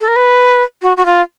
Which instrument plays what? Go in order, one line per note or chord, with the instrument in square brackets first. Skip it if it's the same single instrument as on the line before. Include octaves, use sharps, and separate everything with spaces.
[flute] A4
A#4
B4
F#4
F#4
F4